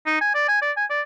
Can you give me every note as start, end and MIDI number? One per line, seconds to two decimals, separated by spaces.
0.06 0.18 63
0.21 0.32 80
0.35 0.46 74
0.49 0.62 80
0.62 0.72 74
0.77 0.85 80
0.90 1.01 74